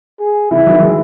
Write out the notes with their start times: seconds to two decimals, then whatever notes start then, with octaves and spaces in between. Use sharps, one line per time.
0.19 G#4
0.51 C#3 E3 E4
0.66 D#3 F#3
0.82 E3 G#3